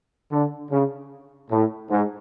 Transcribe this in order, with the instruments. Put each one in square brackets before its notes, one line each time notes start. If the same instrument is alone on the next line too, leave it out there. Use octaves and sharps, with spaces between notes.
[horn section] D3
C#3
A2
G#2